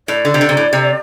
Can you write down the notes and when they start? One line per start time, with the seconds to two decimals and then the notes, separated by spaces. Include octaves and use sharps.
0.08 A2 D5
0.25 D3
0.34 C3
0.41 D3
0.49 C3
0.57 A2
0.73 C3